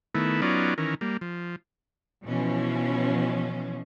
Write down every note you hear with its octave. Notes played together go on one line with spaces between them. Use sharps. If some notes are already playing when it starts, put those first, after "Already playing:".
D#3 A3 B3 E4
F#3 B3 C#4 D#4 F4 D5
D#3 E3 C#4 A#4
G3 A#3
F3
B2 E3 F3 C#4